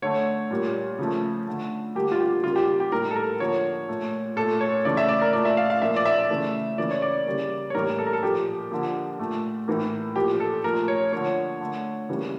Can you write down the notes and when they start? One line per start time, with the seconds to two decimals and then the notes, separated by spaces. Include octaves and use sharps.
0.02 D3 A3 C#5
0.51 A#2 G3 A#3
0.99 C#3 F3 A3
1.47 D3 A3
1.95 D3 G3 A#3 G4
2.12 F4
2.20 G4
2.44 C#3 G3 A#3 F4
2.56 G4
2.80 G4
2.92 A2 G3 A#3 A#4
3.11 A4
3.16 A#4
3.40 D3 F3 A#3 C#5
3.88 A#2 A3
4.36 A#2 A3 A4
4.61 C#5
4.85 C#3 E3 A3 D5
4.97 E5
5.09 D5
5.21 A#4
5.33 A#2 A3 D5
5.45 E5
5.57 F5
5.70 F5
5.82 A#2 F3 A#3 E5
5.96 D5
6.05 E5
6.30 C#3 E3 A3
6.78 C#3 E3 A#3 D5
6.91 C#5
7.02 D5
7.26 C#3 G3 A#3
7.70 C#5
7.75 A2 E3 G3 A#3 A#4
7.99 A4
8.07 A#4
8.13 A4
8.23 A#2 F3 A#3 G4
8.71 D3 F3 A#3
9.19 A#2 A3
9.68 A2 E3 A#3
10.16 A#2 F3 A#3 G4
10.40 A4
10.64 A#2 F3 A3 A#4
10.88 C#5
11.12 D3 F3 A#3 C#5
11.61 D3 A3
12.09 C#3 E3 G3 A#3